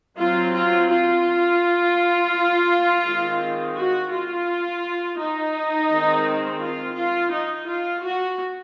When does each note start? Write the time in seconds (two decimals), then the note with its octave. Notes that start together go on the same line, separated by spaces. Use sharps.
0.17 F#3 C4 F4
0.54 F4
0.90 F4
3.04 D#3 G#3 C4
3.76 F#4
4.10 F4
5.18 D#4
5.89 D#3 G#3 C4
6.61 F4
6.97 F4
7.32 D#4
7.68 F4
8.03 F#4